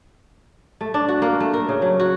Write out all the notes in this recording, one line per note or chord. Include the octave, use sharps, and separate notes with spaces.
A3
D4
F#4
A#3
A3
A#4
C#3
F#3
F#4